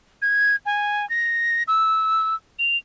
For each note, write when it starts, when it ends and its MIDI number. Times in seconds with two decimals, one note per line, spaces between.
0.22 0.56 92
0.65 1.08 80
1.10 1.63 94
1.68 2.35 88
2.59 2.77 101